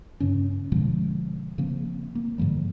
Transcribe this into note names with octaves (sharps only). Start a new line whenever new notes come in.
G2 C#3 C#4
B2 D3 F3 G#3
C#3 F3 A#3 C4
A#3
G#2 D3 F3 G3